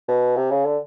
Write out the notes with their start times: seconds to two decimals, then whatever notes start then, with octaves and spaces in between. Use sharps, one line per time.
0.08 B2
0.37 C3
0.51 C#3
0.65 D3